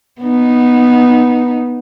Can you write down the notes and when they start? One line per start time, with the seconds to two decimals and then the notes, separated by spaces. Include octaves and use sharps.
0.21 B3 D#4